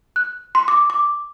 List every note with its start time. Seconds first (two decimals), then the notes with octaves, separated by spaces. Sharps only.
0.16 F#6
0.55 C6
0.68 D6
0.90 D6